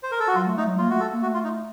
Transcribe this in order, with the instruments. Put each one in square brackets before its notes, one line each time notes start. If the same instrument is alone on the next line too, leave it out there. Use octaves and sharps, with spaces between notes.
[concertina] C5
A#4
A4
F#4
[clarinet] F#3 [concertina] F4
[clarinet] A3
[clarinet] A3 [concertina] D#4
[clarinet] F#3
[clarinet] A#3 [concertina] F4
[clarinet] A3 [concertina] F#4
[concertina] A4
[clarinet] A#3
[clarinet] A3 [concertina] F#4
[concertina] F4
D#4